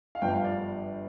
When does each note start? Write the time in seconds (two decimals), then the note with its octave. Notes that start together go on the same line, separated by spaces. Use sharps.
0.15 F5
0.22 G1 G2 F3 G5
0.33 F5
0.44 D5